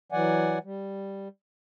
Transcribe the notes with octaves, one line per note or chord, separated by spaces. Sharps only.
E3 F#3 D5 F#5 G#5
G3